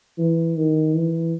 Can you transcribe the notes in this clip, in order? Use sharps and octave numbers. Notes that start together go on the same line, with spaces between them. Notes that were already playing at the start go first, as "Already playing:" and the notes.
E3
D#3
E3